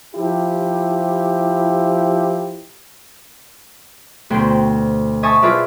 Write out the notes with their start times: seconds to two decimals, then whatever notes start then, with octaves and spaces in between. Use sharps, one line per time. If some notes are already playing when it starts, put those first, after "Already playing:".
0.15 F3 E4 G4
4.30 D2 B2 C5 G5
5.23 D#5 E5 G#5 A5 C#6 D#6
5.42 E4 F4 G#4 B4 D5 E5